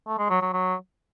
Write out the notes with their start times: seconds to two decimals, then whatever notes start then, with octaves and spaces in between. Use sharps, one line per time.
0.07 A3
0.18 G#3
0.30 F#3
0.42 F#3
0.53 F#3